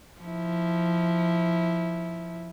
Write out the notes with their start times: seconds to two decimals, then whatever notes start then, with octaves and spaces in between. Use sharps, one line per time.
0.21 F3 E4